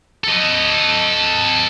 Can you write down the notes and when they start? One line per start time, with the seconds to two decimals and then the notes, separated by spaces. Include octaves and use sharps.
0.24 A4 D#5